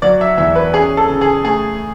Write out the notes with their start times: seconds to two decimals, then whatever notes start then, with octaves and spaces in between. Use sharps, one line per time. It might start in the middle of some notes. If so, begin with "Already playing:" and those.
0.02 F#3 D5
0.21 E5
0.38 E2 E5
0.56 B4
0.73 C#4 G#4
0.97 A4
1.09 C#3
1.21 G#4
1.44 A3 G#4